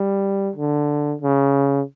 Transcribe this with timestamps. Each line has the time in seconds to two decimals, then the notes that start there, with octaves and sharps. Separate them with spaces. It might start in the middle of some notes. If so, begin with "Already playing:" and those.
Already playing: G3
0.56 D3
1.22 C#3